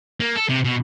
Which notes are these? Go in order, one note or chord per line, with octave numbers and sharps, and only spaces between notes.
A#3
A4
C3
B2